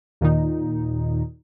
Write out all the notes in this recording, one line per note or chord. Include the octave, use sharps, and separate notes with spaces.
D#2 A#2 D#3 D#4